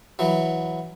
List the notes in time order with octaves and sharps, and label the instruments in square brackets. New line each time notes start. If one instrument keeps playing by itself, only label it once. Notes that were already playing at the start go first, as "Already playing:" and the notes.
[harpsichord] E3 F#3